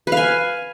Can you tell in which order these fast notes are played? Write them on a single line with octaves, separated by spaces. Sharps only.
B4 F5 G#5